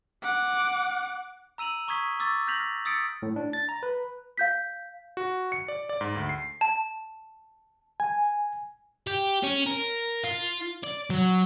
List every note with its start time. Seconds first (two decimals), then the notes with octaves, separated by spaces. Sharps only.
0.23 F#5 D6
1.58 A#5 E6 D#7 F7 F#7
1.88 A#5 C#6 D#6 G#6 B6 G7
2.19 C#6 D6 E6 A6
2.47 F6 G6 A#6 B6 F7 F#7
2.60 F6
2.85 D#6 E6 A6 B6 C#7 D7
3.22 A2
3.36 D4
3.53 A6
3.69 A#5
3.83 B4
4.37 F5 G6 B6
5.17 F#4
5.52 C#7
5.68 D5
5.89 D5
6.01 G#2
6.16 D2
6.29 C7
6.61 A5
8.00 G#5
9.07 G4
9.43 C#4
9.66 A#4
10.24 F4
10.84 D5
11.10 F#3